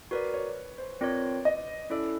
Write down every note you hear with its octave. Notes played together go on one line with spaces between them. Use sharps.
F#4 A#4 B4 D5
C#5
C5
C4 F4 A#4 C#5 D5
D#5
C#4 E4 A4 D5